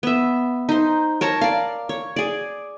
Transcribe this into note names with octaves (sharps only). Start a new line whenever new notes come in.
B3 E5
D#4 C5
A#4 C#5 A5 A#5
D5 F5
C#5
G#4 D5